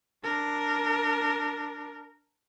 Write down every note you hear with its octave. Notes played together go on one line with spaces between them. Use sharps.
D4 A#4